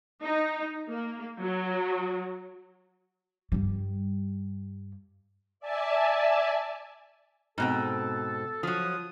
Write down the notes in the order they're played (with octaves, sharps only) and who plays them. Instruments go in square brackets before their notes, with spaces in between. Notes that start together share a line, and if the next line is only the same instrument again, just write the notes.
[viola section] D#4
A#3
F#3
[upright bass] G2 G3
[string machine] D5 E5 G#5 A5
[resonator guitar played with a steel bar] G#2 B2 C4 [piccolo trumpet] A4
[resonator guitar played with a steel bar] F3 F#3 [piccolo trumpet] D#6